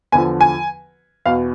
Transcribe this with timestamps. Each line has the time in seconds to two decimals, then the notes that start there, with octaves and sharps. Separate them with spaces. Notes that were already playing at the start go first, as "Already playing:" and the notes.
0.12 E2 D3 F3 G#5
0.41 G#5
1.26 E2 B2 F5